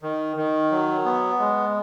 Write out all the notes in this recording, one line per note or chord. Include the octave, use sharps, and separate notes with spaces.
D#3
D#3
F#3
B3
G#3